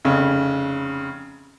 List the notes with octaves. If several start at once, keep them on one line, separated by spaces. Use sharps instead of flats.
F1 C#3